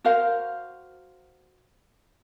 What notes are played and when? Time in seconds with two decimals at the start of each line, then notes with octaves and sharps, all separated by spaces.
0.04 F#4 A#4 C5 F5